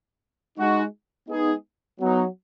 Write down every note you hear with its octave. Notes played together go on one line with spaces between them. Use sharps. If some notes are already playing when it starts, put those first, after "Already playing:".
G#3 D#4 F#4
G#3 B3 D#4 G#4
F#3 B3 D#4